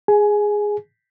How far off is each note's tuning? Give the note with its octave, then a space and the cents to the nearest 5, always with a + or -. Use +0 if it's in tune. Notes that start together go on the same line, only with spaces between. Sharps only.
G#4 -5 G#5 +15